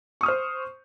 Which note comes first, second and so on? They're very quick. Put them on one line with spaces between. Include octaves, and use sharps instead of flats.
C#6 D#6 F6 C5